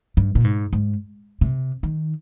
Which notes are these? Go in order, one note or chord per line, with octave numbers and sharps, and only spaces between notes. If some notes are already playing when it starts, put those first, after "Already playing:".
G2
A#2
G#2
G#2
C3
D#3